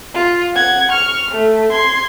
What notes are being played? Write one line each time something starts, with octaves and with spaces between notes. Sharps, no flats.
F4
F#5 G#6
C#6 F6
A3
C6 G#6